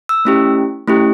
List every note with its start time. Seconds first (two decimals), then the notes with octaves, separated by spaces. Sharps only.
0.09 E6
0.25 A3 C#4 E4 G4
0.88 A3 C#4 E4 G4